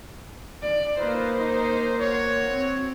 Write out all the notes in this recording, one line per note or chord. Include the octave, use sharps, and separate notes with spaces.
D5
A#3 D#4 F4 B4 C5
D#4
F#4 C#5
C4